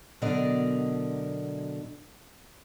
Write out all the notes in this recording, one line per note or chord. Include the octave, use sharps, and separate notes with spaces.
B2 D3 F#3 A#4 D5 D#5